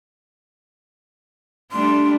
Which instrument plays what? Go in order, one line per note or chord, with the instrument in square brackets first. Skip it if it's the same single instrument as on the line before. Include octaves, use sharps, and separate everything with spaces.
[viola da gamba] G3 A3 D4 [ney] C6